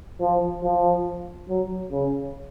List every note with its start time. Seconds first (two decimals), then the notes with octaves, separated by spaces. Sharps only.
0.21 F3
0.63 F3
1.49 F#3
1.92 C#3